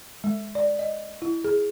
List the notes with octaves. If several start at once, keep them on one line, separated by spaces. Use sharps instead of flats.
G#3
D5
D#5
E4
G#4